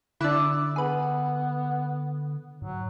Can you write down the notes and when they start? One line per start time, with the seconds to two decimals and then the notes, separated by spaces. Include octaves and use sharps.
0.21 D3 D4 E4 D6 E6 F#6
0.76 B3 G#4 B4
2.62 G#2 F#3